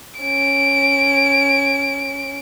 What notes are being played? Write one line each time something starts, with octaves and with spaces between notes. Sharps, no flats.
C#4 D7